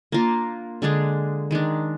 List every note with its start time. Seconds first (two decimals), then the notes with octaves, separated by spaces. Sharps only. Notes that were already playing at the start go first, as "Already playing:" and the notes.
0.12 A#3 D4 F4 A#4
0.82 D3 G#3 D4 G#4
1.51 D#3 G#3 D4